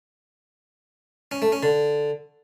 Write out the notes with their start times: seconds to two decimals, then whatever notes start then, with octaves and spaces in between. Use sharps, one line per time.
1.32 C#4
1.42 A3
1.52 C#4
1.63 D3